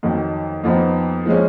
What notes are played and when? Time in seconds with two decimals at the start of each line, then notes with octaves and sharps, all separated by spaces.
0.03 F2 D#3 F#3
0.64 F2 F3 B3 D#4
1.26 F3 G#3 C#4